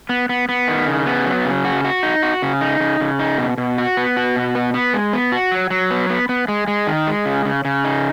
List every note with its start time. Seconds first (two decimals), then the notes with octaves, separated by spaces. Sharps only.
0.09 B3
0.29 B3
0.49 B3
0.68 D#3
0.87 C#3
1.06 B3
1.26 F#3
1.45 C#3
1.65 F#4
1.84 F#4
2.03 D#4
2.23 F#4
2.43 C#3
2.61 D#4
2.80 C#3
3.00 C#3
3.19 D#4
3.38 B2
3.58 B2
3.78 F#4
3.97 B3
4.17 F#4
4.36 B2
4.55 B3
4.74 B3
4.94 G#3
5.13 B3
5.32 F#4
5.52 F#3
5.70 F#3
5.90 B3
6.09 B3
6.29 B3
6.48 G#3
6.68 G#3
6.87 D#3
7.07 G#3
7.25 C#3
7.45 C#3
7.65 C#3
7.85 D#4